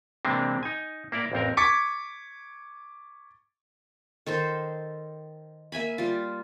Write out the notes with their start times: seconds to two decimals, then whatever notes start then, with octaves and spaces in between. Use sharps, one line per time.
0.25 C3 E3 G#3 A#3 C4 D4
0.63 D#4 G#5
1.12 A#3 E4 A#4 D5
1.32 A1 F2 C4 A#4
1.57 C#6 D6 G#6 A6 B6 C#7
4.26 D#3 A4 C5
5.72 A#3 E5 G#5 B5
5.98 G3 F4